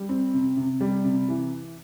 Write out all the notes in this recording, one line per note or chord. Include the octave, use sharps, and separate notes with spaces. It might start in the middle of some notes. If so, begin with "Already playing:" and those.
Already playing: G3
C4
C3
C3
G3
C3
E3